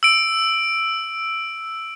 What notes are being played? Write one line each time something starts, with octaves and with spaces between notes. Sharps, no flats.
E6 D7